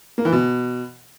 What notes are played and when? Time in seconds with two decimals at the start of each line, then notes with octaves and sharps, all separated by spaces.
0.18 A#3
0.25 E3
0.32 B2